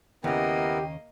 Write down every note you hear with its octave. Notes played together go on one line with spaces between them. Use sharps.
D#2 C#3 A#3 B3 E4 G4 A#4 D#5